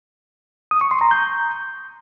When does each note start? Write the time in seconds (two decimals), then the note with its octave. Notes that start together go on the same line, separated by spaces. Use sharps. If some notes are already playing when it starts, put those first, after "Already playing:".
0.71 D#6
0.81 C#6
0.91 C6
1.01 A#5
1.11 G6